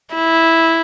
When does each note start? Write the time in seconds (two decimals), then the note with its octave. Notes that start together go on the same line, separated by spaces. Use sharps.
0.15 E4